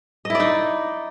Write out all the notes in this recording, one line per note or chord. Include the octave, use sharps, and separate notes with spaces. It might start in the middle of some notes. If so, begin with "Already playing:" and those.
D#4 E4 D5 D#5